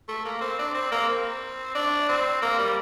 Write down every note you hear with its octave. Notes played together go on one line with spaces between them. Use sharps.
A3
A#3
C4
D4
C4
A#3
C4
D4
C4
A#3
G3